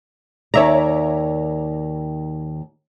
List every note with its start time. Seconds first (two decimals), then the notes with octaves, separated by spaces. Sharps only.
0.54 D#2 D#3 C#5 D5 E5 A#5